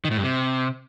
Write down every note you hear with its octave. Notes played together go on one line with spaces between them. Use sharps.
D#3
A2
G2
C3